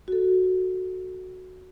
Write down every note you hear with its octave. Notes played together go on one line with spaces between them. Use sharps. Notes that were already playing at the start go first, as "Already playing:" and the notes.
F#4 A4